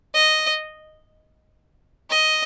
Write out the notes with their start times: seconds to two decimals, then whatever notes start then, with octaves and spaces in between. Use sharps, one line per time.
0.15 D#5
2.10 D#5